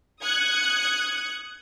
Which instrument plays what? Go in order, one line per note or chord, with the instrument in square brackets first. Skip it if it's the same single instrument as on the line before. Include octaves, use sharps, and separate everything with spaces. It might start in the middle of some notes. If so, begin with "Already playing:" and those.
[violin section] D#6 F#6 G#6 C#7